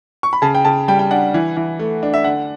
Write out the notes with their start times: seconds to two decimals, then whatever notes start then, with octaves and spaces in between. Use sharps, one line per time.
0.23 C#6
0.33 B5
0.42 C#3 A5
0.55 G5
0.65 C#3 A5
0.88 G3 G5
0.99 G5
1.11 D4 F#5
1.34 E3
1.57 E3
1.79 A3
2.03 D4
2.14 E5
2.24 D3 F#5